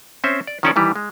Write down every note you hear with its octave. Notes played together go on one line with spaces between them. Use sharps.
C4 C#4 C5 E5
D5
D#3 F3 C#4 A4 D5
D#3 E3 G3 E4
G#3